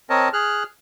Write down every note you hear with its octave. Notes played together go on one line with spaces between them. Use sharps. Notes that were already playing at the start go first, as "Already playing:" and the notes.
C4 A#4 C#5 D#5 A5
G#4 F6 F#6